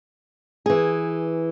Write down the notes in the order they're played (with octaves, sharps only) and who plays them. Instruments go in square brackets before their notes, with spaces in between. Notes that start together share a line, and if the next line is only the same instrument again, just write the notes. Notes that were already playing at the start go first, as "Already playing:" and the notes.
[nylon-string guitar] E3 G#4